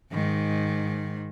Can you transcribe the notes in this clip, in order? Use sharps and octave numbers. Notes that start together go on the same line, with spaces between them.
G#2 D#3